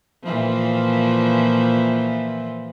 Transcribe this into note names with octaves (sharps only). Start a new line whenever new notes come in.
A#2 E3 F3